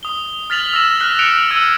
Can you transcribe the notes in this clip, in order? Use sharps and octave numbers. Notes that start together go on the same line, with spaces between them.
D#6 G7
F6 A6 B6 F7 F#7
E6 A#6 E7
F6 F#6 B6
F#6 C#7 D7 E7 F7
E6 G#6 D#7